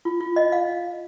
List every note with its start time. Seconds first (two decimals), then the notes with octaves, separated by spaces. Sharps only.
0.05 F4
0.21 F4
0.36 D#5
0.52 F5